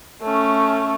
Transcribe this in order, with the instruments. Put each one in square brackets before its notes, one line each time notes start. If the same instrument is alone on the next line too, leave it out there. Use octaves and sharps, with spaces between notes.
[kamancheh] A3 C#4